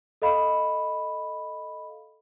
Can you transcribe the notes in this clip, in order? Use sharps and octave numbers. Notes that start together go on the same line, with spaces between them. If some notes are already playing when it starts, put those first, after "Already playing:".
A4 D#5 F5 B5